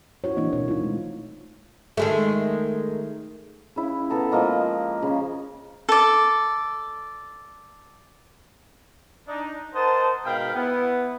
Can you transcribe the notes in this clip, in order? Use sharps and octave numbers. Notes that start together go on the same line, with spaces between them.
E4 F#4 C#5
E3 A#3 C4 D4 E4 D#5
B2 D4 C#5
D#4 F4
G#3 A3
D#3 G#3 A3
C#3 E4
B3 A4 A#5
F3 G#3 A#3 D#5
C#3
A4 D5
D4 D#4
A#4 C5 D#5 F#5 A5
G#2 B2 A#4 F5 G5 B5
B3 E4